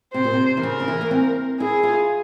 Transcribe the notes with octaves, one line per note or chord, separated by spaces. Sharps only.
C3 C5
A#2
C3
E3
C#3 A#4
C#3
E3
A#3
C4
E4 G#4
F4